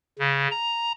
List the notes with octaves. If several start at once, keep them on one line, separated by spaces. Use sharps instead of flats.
C#3
A#5